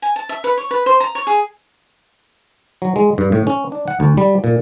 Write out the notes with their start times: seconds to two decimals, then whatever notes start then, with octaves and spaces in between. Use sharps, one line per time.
0.02 G#5
0.16 A5
0.29 E5
0.44 B4
0.57 C#5
0.71 B4
0.86 C5
1.00 A#5
1.15 C#5
1.27 G#4
2.82 F#3
2.96 G#3
3.18 G2
3.32 A2
3.47 C#4
3.72 D4
3.88 F#5
4.00 D2
4.17 G3
4.44 A#2